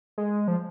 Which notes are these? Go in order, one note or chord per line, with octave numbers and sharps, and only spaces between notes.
G#3
F3